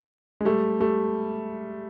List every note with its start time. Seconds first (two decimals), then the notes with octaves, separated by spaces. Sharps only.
0.41 G#3
0.45 G3 A3
0.80 G3 A3